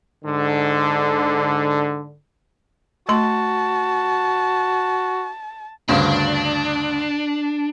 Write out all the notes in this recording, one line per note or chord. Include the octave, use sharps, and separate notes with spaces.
G#2 D3
A3 F#4 A5 C6
D2 G2 C#3 D4